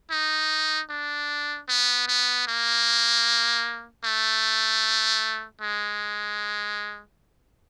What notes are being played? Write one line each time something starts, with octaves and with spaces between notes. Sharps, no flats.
D#4
D4
B3
B3
A#3
A3
G#3